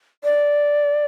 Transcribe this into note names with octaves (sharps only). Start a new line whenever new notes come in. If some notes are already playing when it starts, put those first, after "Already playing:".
D5